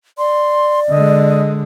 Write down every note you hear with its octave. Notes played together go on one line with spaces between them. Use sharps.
D5 C6
D3 G#3 D#5